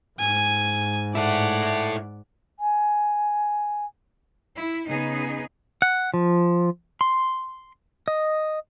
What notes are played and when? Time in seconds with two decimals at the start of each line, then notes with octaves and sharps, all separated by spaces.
0.20 G#2 G#5
1.15 E4 A4 D5 F#5
2.59 G#5
4.58 E4
4.88 C#3 B3 D#4 G#4
5.82 F#5
6.14 F3
7.01 C6
8.08 D#5